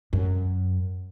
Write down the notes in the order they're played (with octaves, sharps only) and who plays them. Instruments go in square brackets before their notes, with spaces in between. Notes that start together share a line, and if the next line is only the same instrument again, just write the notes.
[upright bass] F#2